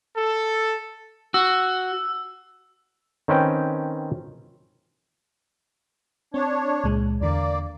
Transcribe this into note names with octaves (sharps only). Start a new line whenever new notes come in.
A4
F#4 E6
D#3 C4 C#4 B4 G5
C4 D4 C#5
C#2 A#2 G#3
E2 D3 A#3 D5